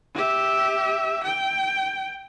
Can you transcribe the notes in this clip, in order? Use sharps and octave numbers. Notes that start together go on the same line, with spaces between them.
G4 E5
G5